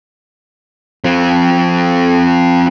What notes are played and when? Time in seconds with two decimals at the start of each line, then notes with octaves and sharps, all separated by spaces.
1.04 F3 C4